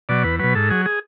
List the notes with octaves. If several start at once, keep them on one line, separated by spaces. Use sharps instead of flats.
B2 F#3 D5
E2 B4
B2 F#3 B4
G#2 A4
F#3 G#4
G#4